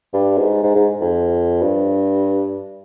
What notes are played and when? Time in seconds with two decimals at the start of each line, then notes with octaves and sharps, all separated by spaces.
0.14 G2
0.38 G#2
0.64 G#2
0.75 G#2
1.01 F2
1.62 G2